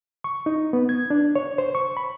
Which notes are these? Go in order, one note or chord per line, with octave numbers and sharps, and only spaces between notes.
C#6
D#4
B3
G#6
D4
C#5
C5
C#6
B5